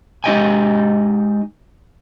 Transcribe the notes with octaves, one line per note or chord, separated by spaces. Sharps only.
G#3 D#4 G4 D#5 G5 G#5